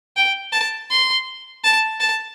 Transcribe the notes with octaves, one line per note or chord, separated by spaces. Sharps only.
G5
A5
C6
A5
A5